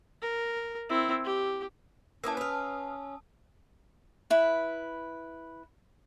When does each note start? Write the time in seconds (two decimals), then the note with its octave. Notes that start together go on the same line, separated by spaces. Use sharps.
0.22 A#4
0.90 C4 E4
1.25 G4
2.24 A#3 B3 C#4 E4 A5 D#6 E6
2.37 B4 F5
4.30 E4 B4